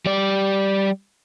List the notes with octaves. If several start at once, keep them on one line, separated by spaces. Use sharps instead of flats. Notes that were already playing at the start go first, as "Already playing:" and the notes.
G3 D5